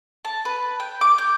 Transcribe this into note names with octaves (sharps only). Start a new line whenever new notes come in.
A5
B4
G5
D6
G6